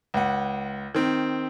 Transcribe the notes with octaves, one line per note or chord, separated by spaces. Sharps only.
C#2 F#5
D#3 C4